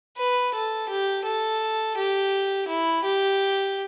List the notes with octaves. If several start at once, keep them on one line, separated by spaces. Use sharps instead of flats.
B4
A4
G4
A4
G4
E4
G4